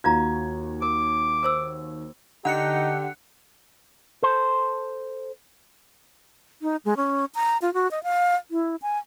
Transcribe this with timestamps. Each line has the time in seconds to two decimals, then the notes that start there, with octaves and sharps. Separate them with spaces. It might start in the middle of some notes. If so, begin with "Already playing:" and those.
0.04 D#2 F4 F#4 F5 A#5 G#6
0.82 A#4 D6
1.43 A#4 C5 E6
2.45 D3 D#4 G4 F#5 F#6 C#7
4.23 A4 C5
6.62 D#4
6.85 G#3
6.97 C#4
7.35 A#5
7.62 F4
7.74 F#4
7.91 D#5
8.03 F5
8.51 E4
8.82 G#5